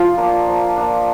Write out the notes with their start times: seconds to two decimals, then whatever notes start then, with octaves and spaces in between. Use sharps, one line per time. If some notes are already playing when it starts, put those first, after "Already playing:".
Already playing: F3 F4
0.17 A#3 D4
0.48 F3
0.76 A#3 D4